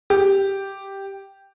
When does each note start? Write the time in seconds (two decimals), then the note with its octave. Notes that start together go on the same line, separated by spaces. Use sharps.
0.10 G4